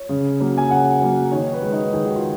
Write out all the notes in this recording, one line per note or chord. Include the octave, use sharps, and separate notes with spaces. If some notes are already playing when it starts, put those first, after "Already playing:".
Already playing: C#5
C#3
F#3 A#3
G#5
C#3 F#5
F#3 A#3
D#3 C#5
B4
G#3
D#4
D#3 G#4
F#4
F4